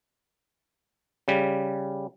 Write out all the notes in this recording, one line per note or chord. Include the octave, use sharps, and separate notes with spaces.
C#3 G3